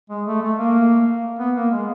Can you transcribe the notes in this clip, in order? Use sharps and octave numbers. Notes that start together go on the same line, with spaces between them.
G#3
A3
A3
A#3
B3
A#3
G#3